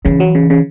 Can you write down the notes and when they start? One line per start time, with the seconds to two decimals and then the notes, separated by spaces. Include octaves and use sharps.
0.05 C#3 E3
0.20 F#3
0.35 C#3
0.50 C#3